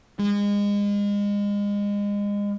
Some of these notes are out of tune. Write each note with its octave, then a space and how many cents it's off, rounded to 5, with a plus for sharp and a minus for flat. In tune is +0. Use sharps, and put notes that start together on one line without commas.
G#3 -30